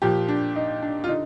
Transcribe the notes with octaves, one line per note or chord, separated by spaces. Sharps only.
A#2 F3 G4
D4
D#4
D4
F4
D3 D#4